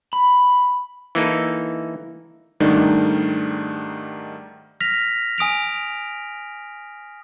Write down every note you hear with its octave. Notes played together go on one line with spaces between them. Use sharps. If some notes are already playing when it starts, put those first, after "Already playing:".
B5
E3 A#3 D#4 A4
G#2 D#3 G3 A3 D4 D#4
F6 A#6 B6 F7
G#5 D#6 D7 F7